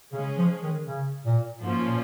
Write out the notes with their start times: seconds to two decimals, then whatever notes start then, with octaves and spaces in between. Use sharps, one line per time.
0.13 C#3 G#3 C#4 G#4
0.38 F3
0.63 D#3
0.88 C#3
1.26 A#2
1.62 G#2 F3 A#3 C#4 F4
1.88 A#2